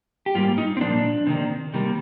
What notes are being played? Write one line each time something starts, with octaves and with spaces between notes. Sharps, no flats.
G4
G#2 G3 A#3 F4
D#4
C4
A#2 F3 A#3 D4
C3 D#3 A#3
C3 D#3 G3 A#3